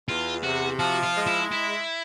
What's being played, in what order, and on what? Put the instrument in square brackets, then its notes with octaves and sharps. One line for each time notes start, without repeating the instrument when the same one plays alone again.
[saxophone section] E2 [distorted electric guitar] F4
[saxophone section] C3 [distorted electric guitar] F#4
[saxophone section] F3 [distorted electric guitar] F#4
[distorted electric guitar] F4
[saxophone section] G#3
[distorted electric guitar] E4
E4